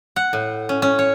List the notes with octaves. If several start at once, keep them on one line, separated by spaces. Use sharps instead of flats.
F#5
A2
C#4
C#4
C#5